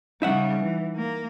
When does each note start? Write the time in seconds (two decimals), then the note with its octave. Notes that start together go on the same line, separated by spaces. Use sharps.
0.22 C#3 G3 D#4 E5 F#5
0.61 E3
0.96 A#3